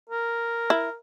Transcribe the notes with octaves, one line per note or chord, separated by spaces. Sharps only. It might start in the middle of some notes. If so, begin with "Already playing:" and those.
A#4
E4